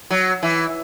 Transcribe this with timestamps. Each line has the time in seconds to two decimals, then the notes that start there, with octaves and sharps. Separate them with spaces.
0.10 F#3
0.43 E3